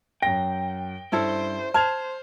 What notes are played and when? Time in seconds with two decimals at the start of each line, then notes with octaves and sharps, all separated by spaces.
0.22 F#2 G5 A#6
1.12 G2 C#4 E4 A4 C5
1.74 C5 A5 F6 G#6 F7